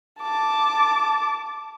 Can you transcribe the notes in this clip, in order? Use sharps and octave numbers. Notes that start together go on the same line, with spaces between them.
A5 D6